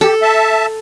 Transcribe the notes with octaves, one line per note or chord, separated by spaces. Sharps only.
G4 A4
E5 A5